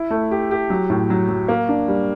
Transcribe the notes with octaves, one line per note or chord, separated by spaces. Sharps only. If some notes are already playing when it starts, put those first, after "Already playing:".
Already playing: E4
A3
G4
G4
F#3
A2
F#3
F#3
A#3
D4
G3